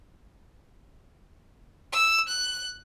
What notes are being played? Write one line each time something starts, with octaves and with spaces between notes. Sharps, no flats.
E6
F#6